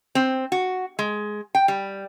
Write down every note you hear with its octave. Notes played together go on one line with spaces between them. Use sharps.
C4
F#4
G#3
G5
G3